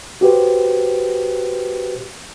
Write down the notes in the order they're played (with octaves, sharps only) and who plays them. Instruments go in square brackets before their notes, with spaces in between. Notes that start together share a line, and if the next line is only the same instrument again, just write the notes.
[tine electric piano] F#4 G4 B4 C5